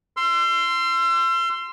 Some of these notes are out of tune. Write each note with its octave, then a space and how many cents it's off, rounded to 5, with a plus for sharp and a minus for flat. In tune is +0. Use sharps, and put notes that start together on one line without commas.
C6 -5 E6 +40